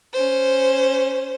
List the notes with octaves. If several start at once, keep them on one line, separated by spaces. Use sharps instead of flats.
C#4 C5